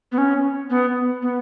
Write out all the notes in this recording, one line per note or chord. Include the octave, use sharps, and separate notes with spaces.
B3
C#4
B3
B3